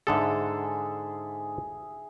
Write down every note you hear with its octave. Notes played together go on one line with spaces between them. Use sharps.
G#2 D3 G#4 A4 E5